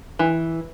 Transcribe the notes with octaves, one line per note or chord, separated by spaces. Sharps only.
E3